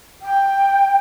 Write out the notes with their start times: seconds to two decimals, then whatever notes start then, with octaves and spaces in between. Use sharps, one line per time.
0.21 G5